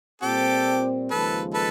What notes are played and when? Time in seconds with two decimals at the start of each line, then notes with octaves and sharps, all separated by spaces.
0.22 A#2 G3 C4 G4 A4
1.11 D#2 C#3 F3 G#3 A4 B4
1.54 A4 B4